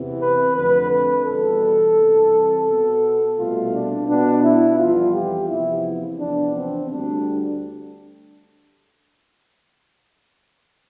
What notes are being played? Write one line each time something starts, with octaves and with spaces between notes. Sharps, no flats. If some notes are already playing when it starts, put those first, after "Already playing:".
Already playing: E2 C3 E3 B3
B4
F2 D3 A3 B4
B4
E2 B2 G3 A4
C2 C3 E3
B2 B3
C2 B2 A3 F4
D4
B2 B3 D4
E4
F2 E3 G3 B3 F4
G4
E2 C3 F3 B3 E4
E2 C3 F3 B3 D4
C4
D2 D3 G3 D4